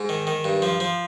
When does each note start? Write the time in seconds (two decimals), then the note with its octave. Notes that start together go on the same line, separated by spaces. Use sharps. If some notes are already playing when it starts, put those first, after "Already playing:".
Already playing: G#2
0.09 D#3
0.27 D#3
0.44 G2
0.62 F3
0.80 F3